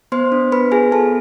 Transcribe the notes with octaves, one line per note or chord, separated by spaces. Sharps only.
B3 C5 C6
D4
B3 B4 B5
F4 G#4 G#5
B3 A4 A5